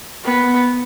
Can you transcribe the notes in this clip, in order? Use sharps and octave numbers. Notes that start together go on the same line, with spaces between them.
B3